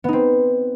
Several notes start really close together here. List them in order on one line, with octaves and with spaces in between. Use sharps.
B3 D#4 C4